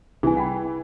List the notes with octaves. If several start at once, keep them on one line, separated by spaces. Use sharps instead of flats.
C2 E3 G#4 G#5
F#5 G5 B5